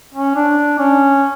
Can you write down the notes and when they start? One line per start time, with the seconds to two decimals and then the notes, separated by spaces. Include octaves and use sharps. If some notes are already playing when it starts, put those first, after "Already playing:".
0.15 C#4
0.36 D4
0.79 C#4